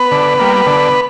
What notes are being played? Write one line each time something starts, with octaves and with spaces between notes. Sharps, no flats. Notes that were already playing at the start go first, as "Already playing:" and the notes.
Already playing: B3 B4
D3
G3 A#3
D3